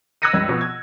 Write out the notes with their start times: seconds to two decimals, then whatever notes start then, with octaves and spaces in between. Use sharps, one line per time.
0.22 E6 F#6 G#6 A#6 C#7 D#7
0.33 C#2 G2 G#6
0.49 B2 F3
0.61 G#6